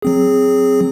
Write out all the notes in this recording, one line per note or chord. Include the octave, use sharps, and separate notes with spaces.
F#3 C4 G#4